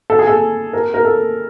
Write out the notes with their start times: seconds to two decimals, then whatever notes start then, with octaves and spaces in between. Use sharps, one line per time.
0.10 A4
0.19 G#4
0.27 A4
0.73 A#4
0.94 A#4
1.05 A4